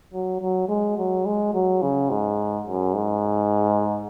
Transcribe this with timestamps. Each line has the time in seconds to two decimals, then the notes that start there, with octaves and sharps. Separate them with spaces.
0.13 F#3
0.41 F#3
0.69 G#3
0.97 F#3
1.25 G#3
1.54 F#3
1.82 C#3
2.10 G#2
2.67 F#2
2.95 G#2